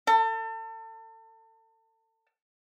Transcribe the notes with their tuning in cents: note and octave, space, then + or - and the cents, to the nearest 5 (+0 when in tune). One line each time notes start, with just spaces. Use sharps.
A4 +35